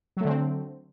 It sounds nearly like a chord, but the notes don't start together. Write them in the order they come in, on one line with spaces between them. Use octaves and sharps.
F#3 A3 D3 C4